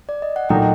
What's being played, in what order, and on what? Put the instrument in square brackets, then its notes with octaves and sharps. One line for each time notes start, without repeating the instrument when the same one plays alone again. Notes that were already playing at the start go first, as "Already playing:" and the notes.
[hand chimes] D5
D#5
F#5
[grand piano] A#2 F#3 A3 D#4 [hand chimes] D#5 G5